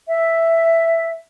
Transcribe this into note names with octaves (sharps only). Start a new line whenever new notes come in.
E5